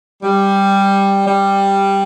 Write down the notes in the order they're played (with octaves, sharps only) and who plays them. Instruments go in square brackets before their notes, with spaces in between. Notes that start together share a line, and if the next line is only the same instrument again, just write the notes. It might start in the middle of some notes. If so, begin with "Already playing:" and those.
[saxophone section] G3
G3